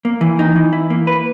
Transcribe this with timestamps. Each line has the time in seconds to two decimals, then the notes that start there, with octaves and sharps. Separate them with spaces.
0.05 A#3
0.21 E3
0.39 D#4
0.56 E3
0.73 E4
0.90 A#3
1.07 B4